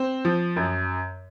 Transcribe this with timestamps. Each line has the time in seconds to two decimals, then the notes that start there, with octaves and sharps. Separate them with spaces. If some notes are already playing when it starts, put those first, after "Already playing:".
Already playing: C4 C5
0.25 F3
0.56 F#2